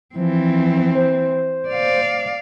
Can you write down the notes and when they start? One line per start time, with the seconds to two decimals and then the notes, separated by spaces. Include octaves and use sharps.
0.15 E3 F3 C4
0.95 C5
1.69 D5 F5